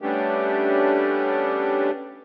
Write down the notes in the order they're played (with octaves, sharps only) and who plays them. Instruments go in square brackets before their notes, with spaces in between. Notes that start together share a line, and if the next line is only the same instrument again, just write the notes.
[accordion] G3 A3 B3 C#4 D4 G4